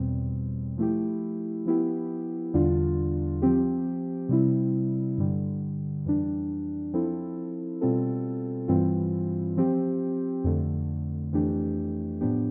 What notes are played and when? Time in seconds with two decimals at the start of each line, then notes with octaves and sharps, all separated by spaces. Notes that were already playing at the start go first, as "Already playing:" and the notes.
Already playing: E2 B2 G3 C4
0.77 F3 A3 E4 G4
1.65 F3 B3 E4 G4
2.54 E2 D3 G3 D4 F4
3.42 F3 C4 G4
4.29 C3 G3 C4 E4
5.18 G2 D3 G3
6.05 F2 E3 G3 D4
6.93 F3 C4 E4 A4
7.81 B2 G3 C4 F4 A4
8.68 G2 E3 G3 C4 F4
9.57 F3 C4 G4
10.44 F2 D3 A3
11.33 F2 E3 A3 D4 G4
12.21 A2 F3 B3 D4 G4